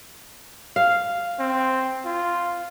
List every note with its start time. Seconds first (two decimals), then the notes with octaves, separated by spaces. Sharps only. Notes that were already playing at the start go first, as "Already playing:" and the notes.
0.76 F5
1.39 C4
2.05 F4